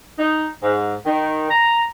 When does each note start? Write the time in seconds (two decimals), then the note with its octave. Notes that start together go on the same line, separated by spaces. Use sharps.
0.18 D#4
0.63 G#2
1.06 D#3
1.50 A#5